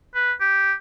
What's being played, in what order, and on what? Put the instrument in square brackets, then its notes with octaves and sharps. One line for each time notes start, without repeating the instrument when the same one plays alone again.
[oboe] B4
G4